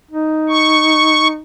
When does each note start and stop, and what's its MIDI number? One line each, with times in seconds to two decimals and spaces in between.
0.11 1.42 63
0.49 1.27 85